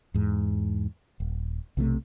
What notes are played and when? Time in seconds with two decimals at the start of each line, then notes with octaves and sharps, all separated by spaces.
0.14 E2 G#2
1.20 D#1
1.77 B1 C3 E3 A3